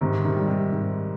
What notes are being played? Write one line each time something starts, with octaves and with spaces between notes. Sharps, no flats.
G#2 C3 D#3
C3 D#3
G3
C3
G#2